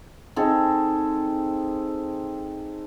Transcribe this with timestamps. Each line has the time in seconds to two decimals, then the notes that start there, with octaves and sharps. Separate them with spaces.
0.36 C4 D#4 G#4 A4